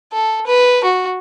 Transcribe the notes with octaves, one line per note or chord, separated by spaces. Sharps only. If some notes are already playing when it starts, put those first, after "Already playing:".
A4
B4
F#4